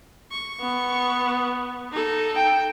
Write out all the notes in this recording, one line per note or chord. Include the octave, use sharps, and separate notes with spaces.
C#6
B3
D#4 A4
G5